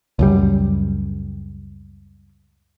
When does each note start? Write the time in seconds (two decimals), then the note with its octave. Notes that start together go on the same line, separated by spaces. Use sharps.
0.19 C#2 F#2 G3